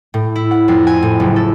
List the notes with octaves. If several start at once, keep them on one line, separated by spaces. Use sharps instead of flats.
A2
E4
F#5
F2
G#5
A2
F#1
A4